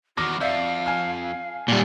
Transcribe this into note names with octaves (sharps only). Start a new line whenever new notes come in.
E2 D#3 F#4 D6 F6 A#6
F2 D5 E5 F5 G6
G#5 F6
A#2 G3